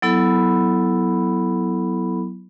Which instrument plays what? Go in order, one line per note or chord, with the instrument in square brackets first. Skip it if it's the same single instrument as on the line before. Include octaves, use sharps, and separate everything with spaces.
[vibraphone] F#3 B3 E4 A4 B5